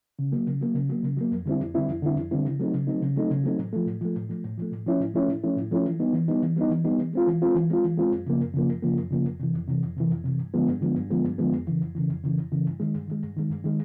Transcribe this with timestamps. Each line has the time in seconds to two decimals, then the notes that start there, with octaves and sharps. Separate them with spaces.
0.19 C#3
0.32 F#3 A#3
0.47 C#3
0.61 F#3 A#3
0.74 C#3
0.89 F#3 A#3
1.03 C#3
1.17 F#3 A#3
1.32 F2
1.46 D3 G3 C4 E4
1.60 F2
1.74 D3 G3 C4 E4
1.89 F2
2.02 D3 G3 C4 E4
2.16 F2
2.31 D3 G3 C4 E4
2.45 C#3
2.59 F#3 A3 C4 D#4
2.74 C#3
2.87 F#3 A3 C4 D#4
3.01 C#3
3.16 F#3 A3 C4 D#4
3.30 C#3
3.44 F#3 A3 C4 D#4
3.59 A2
3.73 F3 A3
3.86 A2
4.01 F3 A3
4.16 A2
4.29 F3 A3
4.44 A2
4.58 F3 A3
4.72 A2
4.87 F3 A3 C#4 E4
5.00 A2
5.14 F3 A3 C#4 E4
5.28 A2
5.43 F3 A3 C#4 E4
5.56 A2
5.72 F3 A3 C#4 E4
5.86 E3
6.00 G3 B3 D#4
6.13 E3
6.28 G3 B3 D#4
6.42 E3
6.56 G3 B3 D#4
6.70 E3
6.85 G3 B3 D#4
6.98 E3
7.13 G#3 C4 F4
7.27 E3
7.42 G#3 C4 F4
7.55 E3
7.70 G#3 C4 F4
7.84 E3
7.97 G#3 C4 F4
8.12 F#2
8.27 C#3 F3 A#3
8.41 F#2
8.54 C#3 F3 A#3
8.68 F#2
8.82 C#3 F3 A#3
8.97 F#2
9.11 C#3 F3 A#3
9.25 F2
9.40 C3 E3
9.54 F2
9.68 C3 E3
9.83 F2
9.97 C3 E3
10.10 F2
10.24 C3 E3
10.39 G2
10.54 D3 F3 G#3 B3
10.67 G2
10.81 D3 F3 G#3 B3
10.96 G2
11.10 D3 F3 G#3 B3
11.24 G2
11.39 D3 F3 G#3 B3
11.52 F2
11.67 C#3 E3
11.81 F2
11.95 C#3 E3
12.10 F2
12.23 C#3 E3
12.37 F2
12.52 C#3 E3
12.66 G2
12.80 D#3 G#3
12.95 G2
13.08 D#3 G#3
13.23 G2
13.36 D#3 G#3
13.50 G2
13.64 D#3 G#3